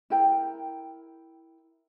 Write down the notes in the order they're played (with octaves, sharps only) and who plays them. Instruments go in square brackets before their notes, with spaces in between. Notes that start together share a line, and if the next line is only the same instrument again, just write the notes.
[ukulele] E4 A#4 G5 A#5